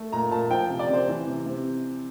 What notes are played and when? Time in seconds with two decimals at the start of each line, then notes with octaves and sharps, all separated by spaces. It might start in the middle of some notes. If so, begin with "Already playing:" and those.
Already playing: A3
0.12 A#2 A#5
0.31 A#2 A5
0.50 F3 G5
0.70 C3
0.79 D5
0.89 C3 C5
1.08 E3
1.27 C3
1.46 C3